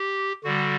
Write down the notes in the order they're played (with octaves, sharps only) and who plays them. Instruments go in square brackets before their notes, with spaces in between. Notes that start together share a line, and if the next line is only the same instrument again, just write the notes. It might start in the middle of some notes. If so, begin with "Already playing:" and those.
Already playing: [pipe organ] G4
D3 G3 F#4